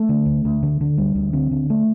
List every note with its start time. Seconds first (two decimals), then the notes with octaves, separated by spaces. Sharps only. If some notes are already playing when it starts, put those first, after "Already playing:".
Already playing: A3
0.09 D3
0.26 D2
0.45 D2
0.63 D3
0.81 D3
0.98 D2 G3
1.15 D2
1.33 D3 C4
1.51 D3
1.70 A3